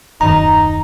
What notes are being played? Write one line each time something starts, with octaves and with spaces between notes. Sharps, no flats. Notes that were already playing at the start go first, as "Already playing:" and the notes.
D#1 F#2 D#3 D#4 A#5